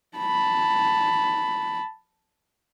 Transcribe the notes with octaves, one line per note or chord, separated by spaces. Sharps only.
A5 B5